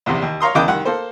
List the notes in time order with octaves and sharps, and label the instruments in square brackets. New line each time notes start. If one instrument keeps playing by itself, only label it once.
[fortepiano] A#1 E2 C3
D#2
C#5 F5 A#5 C6 D#6
E2 C#3 D#5 G5 D6 F#6
C2 D#3 F#5
A#3 A4 C5